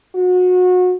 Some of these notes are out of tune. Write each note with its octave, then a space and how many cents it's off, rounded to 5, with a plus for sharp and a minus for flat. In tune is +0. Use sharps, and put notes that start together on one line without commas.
F#4 -30